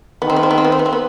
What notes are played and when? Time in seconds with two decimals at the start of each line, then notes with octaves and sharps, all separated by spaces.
0.22 D#3 B3
0.30 C4
0.36 B3
0.43 C4
0.51 B3
0.58 C4
0.64 B3
0.72 C4
0.79 B3
0.86 C4
0.93 B3